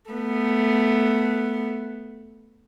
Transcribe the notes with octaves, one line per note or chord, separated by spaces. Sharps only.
A3 B3